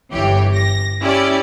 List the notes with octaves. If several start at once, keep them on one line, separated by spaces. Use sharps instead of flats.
G1 E3 G4 C#5
A#6
C#4 E4 G4 D5